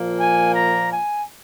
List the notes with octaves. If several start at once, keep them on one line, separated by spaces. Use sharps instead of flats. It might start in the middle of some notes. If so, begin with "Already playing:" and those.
Already playing: A#2 F3 A#3
G#5
A#5
G#5